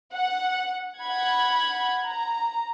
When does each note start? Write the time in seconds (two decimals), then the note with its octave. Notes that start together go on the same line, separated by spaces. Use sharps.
0.13 F#5
1.01 F#5 B5 G#6
2.04 A#5